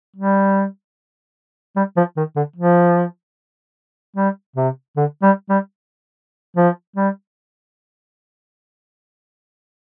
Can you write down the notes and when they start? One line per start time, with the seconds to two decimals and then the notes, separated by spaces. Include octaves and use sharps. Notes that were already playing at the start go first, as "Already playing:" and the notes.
0.16 G3
1.76 G3
1.97 F3
2.17 D#3
2.36 D3
2.56 F3
4.16 G3
4.56 C3
4.97 D3
5.23 G3
5.50 G3
6.57 F3
6.96 G3